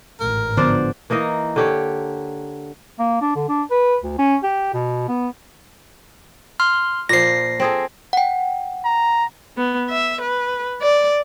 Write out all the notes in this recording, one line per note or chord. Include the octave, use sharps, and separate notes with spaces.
A1 G#2 A#4
D3 F3 B3 D4 C5 D5
E3 A#3 D#4 D#5
D3 G4 C#5
A#3
D4
D3
D4
B4
D2
C#4
G4
B2
B3
C6 F6
A#2 F3 A#6 C7
C4 G#4 A4
F#5 G5
A#5
B3
E5
B4
D5